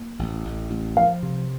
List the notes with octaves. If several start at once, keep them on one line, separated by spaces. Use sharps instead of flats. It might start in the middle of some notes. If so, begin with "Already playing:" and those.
Already playing: A#3
A1
A1
A1
F3 F5
C3